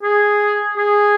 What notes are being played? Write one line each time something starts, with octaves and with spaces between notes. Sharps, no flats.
G#4
G#4